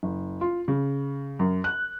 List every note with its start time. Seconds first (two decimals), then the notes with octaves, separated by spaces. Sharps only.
0.03 F#1
0.41 F4
0.68 C#3
1.39 F#2
1.64 F#6